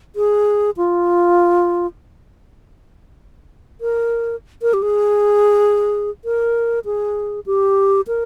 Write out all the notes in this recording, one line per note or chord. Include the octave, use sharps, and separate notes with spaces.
G#4
F4
A#4
A#4
G4
G#4
A#4
G#4
G4
A#4